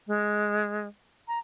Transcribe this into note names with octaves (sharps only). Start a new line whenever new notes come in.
G#3
A#5